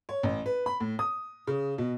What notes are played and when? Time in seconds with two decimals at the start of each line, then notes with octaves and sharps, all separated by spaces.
0.09 C#5
0.23 A1
0.46 B4
0.66 B5
0.80 A2
0.99 D#6
1.47 C#3
1.78 B2